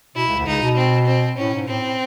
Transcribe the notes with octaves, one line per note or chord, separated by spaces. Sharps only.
B2 E4
C#2 C#3
D2 D3
C#2 C#3 D#4
B2
C4
C4
A2 C#4
G#2
A2 C4
A2